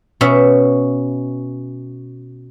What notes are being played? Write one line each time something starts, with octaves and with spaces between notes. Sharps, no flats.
B2 C#4 E5